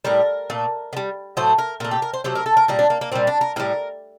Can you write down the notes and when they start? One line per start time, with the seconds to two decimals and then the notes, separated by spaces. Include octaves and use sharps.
0.05 A2 G3 A#4
0.50 A#2 A3
0.93 D3
0.97 G3
1.37 A2 F#3 A3 C5
1.58 A#4
1.80 A#2 A#4
1.84 A3
1.91 G4
2.02 A#4
2.13 C5
2.24 C3 F#3 A3 C5
2.35 A#4
2.46 A4
2.57 A#4
2.68 A#2 G3 A#4
2.79 D4
2.90 A#3
3.01 A#3
3.12 A#2 G3 C4
3.27 D4
3.41 A#4
3.56 A2 G3 A#4